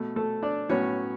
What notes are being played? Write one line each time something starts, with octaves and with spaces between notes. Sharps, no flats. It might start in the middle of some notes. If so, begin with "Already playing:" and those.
Already playing: B2 A3
A3 A4
D4 D5
A2 F#3 B3 C#4 C#5